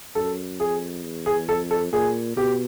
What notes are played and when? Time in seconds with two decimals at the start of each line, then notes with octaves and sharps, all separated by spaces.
0.15 F#2 A4
0.60 F2 G#4
1.04 E2
1.26 G#4
1.48 F2 A4
1.71 A4
1.92 A#2 G#4
2.37 B2 G4